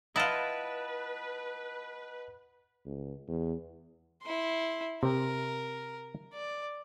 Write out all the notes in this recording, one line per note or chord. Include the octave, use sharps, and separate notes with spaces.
E4 F4 B4 D#5 F#5 A5
C#2
E2
E4 C6
C3 C4 A#4
D5